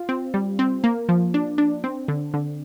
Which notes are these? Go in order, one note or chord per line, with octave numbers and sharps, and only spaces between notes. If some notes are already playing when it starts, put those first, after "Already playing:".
Already playing: F4
C4
G3
C4
A#3
F3
D4
D4
C4
D3
D3